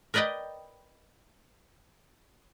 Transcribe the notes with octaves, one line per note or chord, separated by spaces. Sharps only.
A#4 B4 D5 D#5 G5